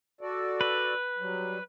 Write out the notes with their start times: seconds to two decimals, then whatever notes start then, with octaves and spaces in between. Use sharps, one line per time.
0.21 F#4 A4 D5
0.61 B4
1.18 F#3 G3